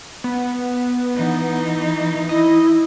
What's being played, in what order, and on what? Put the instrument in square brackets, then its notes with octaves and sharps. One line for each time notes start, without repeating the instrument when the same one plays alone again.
[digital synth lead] B3
[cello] E3 D#4
[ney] E4 [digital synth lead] D#5